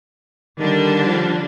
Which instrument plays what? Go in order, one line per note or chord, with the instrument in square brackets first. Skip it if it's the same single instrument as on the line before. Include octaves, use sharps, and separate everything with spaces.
[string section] D3 G3 D4 [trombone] D#3
[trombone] F3